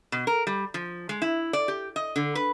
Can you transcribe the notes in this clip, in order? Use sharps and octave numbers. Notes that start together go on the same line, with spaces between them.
B2
A#4
G3
F3
G#3
E4
D5
G4
D#5
D3
B4